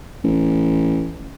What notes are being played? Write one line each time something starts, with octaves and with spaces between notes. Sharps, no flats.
A1